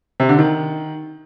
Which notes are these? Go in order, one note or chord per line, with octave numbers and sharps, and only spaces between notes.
C3
D3
D#3